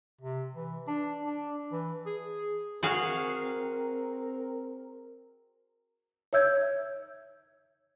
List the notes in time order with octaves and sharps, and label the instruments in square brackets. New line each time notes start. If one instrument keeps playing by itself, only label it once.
[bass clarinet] C3
E3
D4
D4
E3
G#4
[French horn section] C4 A#4 [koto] F#4 G#4 F5
[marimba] C#5 E5 E6 G6 G#6